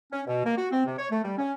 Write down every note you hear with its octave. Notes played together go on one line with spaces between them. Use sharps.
C#4
B2
A#3
F#4
C4
C3
C#5
A3
G3
C#4